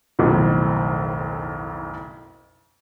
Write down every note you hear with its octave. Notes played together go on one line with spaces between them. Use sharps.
F#1 B1 F2 A2 D#3